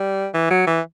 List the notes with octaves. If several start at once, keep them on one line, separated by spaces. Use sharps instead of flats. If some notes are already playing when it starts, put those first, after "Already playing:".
Already playing: G3
E3
F#3
E3